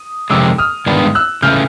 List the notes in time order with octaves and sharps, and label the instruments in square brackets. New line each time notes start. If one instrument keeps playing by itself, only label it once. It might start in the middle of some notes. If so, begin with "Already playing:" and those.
Already playing: [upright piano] D#6
[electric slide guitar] F2 C3 D#3 G#3 [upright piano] D6 E6
[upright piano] D#6 F6
[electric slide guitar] G2 D#3 G#3 B3 D4
[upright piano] E6 F#6
[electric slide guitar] C#3 E3 A3 [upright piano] F6 G6